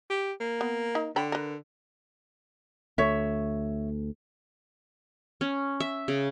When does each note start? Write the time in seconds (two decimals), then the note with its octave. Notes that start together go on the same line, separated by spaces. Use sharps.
0.10 G4
0.40 A#3
0.61 B3
0.95 D#4
1.16 D3 C#5 G5 B5
1.32 A#4 B4
2.98 D2 A3 C#5 E5
5.41 C#4
5.80 E5
6.08 C#3